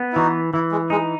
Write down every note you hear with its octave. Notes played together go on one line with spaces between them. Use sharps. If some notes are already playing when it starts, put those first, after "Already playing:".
Already playing: B3
E4
E3 D#4 F#4
E3 E4
G#3
G#3 D#4